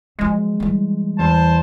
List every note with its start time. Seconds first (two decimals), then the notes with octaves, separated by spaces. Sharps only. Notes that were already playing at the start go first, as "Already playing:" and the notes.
0.19 F3 F#3 G#3
0.60 E3 G3
1.19 E2 C5 A5